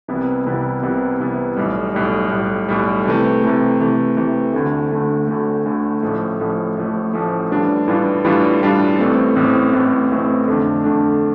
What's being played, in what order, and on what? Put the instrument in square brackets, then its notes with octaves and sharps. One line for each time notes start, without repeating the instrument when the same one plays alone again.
[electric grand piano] C2 C3 E3 B3 E4
C2 C3 E3 B3 E4
C2 C3 E3 B3 E4
C2 C3 E3 B3 E4
B1 A2 G3
B1 A2 G3
B1 A2 G3
B1 A2 G3
C3 E3 A3
C3 E3 A3
C3 E3 A3
C3 E3 A3
D2 D3 A3
D2 D3 A3
D2 D3 A3
D2 D3 A3
A1 A2 F3 A3
A1 A2 F3 A3
A1 A2 F3 A3
A1 A2 F3 A3
A2 E3 G3 D4 F4
A2 E3 G3 D4 F4
A2 E3 G3 D4 F4
A2 E3 G3 D4 F4
A1 A2 E3 A3 C4
A1 A2 E3 A3 C4
A1 A2 E3 A3 C4
A1 A2 E3 A3 C4
F2 D3 A3 D4
F2 D3 A3 D4